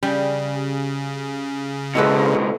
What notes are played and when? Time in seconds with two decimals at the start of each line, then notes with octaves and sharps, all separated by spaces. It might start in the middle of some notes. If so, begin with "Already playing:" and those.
0.03 C#3 G3
1.95 G#2 B2 E4 G#4 A4 B4 D#5